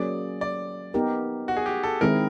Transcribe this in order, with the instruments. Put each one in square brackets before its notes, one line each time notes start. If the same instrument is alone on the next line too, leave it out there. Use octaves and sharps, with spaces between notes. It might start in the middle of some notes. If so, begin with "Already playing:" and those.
Already playing: [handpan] F#3 A#3 C#4 G#4 [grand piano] D5
[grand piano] D5
[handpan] B3 D#4 G4 A#4
[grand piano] F#4
G#4
G4
A4
[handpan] D#3 G#3 C4 E4 G#4 [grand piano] A#4